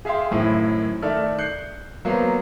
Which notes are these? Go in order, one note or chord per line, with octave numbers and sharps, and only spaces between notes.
G#4 E5 F5 G5 C6
F#2 A2 D#3 C4 E4
D#3 A3 A4 D5 E5 F6
F#6 G6 C7 C#7
F#3 A#3 B3 C5